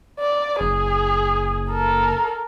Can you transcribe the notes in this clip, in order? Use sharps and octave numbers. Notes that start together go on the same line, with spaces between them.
D5
F#1 G#4
A4 A#4